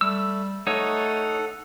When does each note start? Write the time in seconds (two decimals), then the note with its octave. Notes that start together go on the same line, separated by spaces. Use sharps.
0.01 G3 A3 E6
0.67 A3 D#4 A4 C#5 F#5